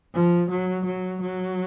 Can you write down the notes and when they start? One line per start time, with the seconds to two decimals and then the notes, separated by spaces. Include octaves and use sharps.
0.14 F3
0.50 F#3
0.86 F#3
1.22 F#3